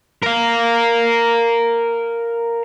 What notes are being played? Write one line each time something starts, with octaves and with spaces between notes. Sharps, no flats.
A#4 F5